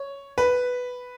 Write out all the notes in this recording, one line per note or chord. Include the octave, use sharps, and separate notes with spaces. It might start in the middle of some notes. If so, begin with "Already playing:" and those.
Already playing: C#5
B4